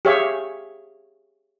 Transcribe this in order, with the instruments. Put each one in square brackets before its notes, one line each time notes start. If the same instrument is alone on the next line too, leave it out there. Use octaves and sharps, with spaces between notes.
[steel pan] G4 G#4 C#5 E5 F5